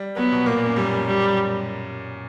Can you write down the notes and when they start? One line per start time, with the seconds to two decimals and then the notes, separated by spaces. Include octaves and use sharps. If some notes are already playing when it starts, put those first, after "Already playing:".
Already playing: G3
0.17 F#3 B3
0.32 B2
0.46 A#2 A#3
0.56 A#2
0.66 F#2
0.76 F#2 G3
1.07 G3